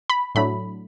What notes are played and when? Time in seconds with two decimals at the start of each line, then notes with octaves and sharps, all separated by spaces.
0.10 B5
0.35 A2 F#3 A3 D4 B5